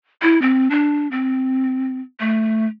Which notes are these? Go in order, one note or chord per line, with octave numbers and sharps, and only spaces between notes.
E4
C4
D4
C4
A3